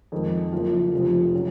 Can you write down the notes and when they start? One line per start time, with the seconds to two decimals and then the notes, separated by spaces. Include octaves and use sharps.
0.12 F2 D#3 G#3 D#4
0.53 F#1 F#2 F3
0.93 F1 F2 F3
1.34 C#3 F#3